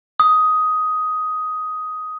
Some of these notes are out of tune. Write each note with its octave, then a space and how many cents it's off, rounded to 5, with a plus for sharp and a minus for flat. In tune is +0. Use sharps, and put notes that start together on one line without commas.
D#6 +10